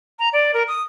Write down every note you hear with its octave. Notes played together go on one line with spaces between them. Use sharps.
A#5
D5
A#4
D#6